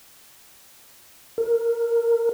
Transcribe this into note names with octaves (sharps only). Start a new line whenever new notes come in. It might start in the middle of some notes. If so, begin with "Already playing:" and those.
A#4